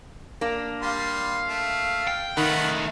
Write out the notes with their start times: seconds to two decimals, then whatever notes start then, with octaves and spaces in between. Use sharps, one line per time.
0.41 A#3 D4
0.82 G3 F5 C6
1.49 A3
2.07 G5
2.37 D#3 A3 D#4 F4 F#5 B5